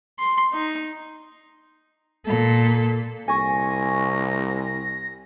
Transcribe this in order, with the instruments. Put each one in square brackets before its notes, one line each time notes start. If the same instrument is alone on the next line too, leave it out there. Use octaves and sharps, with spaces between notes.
[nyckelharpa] C6
D#4
[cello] A#2 A4
[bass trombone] C2 [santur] G#5 C#6 [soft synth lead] A#6